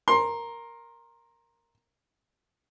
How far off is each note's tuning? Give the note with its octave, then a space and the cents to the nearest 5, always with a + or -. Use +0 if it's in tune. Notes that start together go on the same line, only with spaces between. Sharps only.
A#4 +0 C6 +20